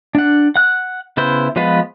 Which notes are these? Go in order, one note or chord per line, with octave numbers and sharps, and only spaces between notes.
D4 F#5
F#5 F#6
C#3 B3 E4 C5
F3 G#3 B3 F4 B4